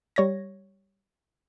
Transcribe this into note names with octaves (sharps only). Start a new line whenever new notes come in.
G3 C#5 G#6 A#6